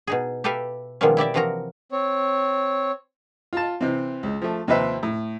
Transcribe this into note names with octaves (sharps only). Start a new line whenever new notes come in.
B2 D#4 G#4
G4 A4 B4 E5 F5
B2 D#3 F3 G#3 A#3 C#4
E4 G4 D5 E5
C3 E3 F3 F#4 A#4 A#5
C4 C#5
F4 A5
C3 E3 C4
C#2
F3 A3
D#2 C3 F3 C4 B4 E5
A2